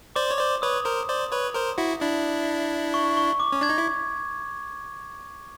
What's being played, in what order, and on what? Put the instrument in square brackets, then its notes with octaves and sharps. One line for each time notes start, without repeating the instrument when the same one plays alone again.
[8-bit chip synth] C5 D5 [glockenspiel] D6
[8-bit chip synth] C#5
C5 D5
[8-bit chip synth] B4 C#5 [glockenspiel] D#6
[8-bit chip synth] A#4 C5
C5 D5
B4 C#5
A#4 C5
E4 F#4
D4 E4
[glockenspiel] C#6
C#6
D6
[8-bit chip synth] C#4
[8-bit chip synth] D4 [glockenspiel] G#6
[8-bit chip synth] D#4
E4